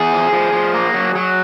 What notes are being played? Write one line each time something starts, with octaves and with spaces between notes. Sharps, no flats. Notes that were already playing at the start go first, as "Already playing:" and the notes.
Already playing: E2 G#4
F3
F3
F3
A#3
F#3
F#3